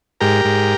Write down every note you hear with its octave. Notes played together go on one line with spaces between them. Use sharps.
G#2 G4 A#4
G#2